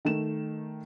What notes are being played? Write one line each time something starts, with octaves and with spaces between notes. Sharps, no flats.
D#3 A3 E7